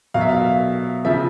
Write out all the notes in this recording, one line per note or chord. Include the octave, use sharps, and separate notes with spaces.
B2 F#3 F5
E5
F5
C#3 F3 E5